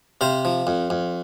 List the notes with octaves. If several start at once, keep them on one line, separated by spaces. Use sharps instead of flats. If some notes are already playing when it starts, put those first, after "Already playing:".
C3 C5 F5
F3
F2
F2